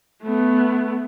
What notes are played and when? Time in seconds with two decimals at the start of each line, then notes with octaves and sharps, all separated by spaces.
0.23 A3 B3